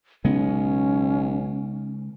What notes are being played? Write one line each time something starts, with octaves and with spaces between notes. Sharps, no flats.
B1 C#3 G#3 B3 C#4